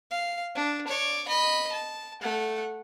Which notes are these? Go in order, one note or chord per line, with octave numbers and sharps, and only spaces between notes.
F5
D4
C#5 D5
D#5 B5
A5
A3 F#5